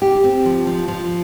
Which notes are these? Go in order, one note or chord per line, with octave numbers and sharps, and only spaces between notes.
G4
C4
F3
F3
F3